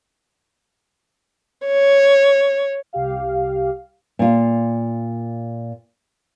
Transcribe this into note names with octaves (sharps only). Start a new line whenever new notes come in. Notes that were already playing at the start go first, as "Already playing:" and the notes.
C#5
C2 G4 F5
A#2 F4